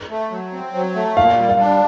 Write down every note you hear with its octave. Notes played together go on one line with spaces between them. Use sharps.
A3
F#3
C4
F#3
A3
A#2 F5
G3
F5
D4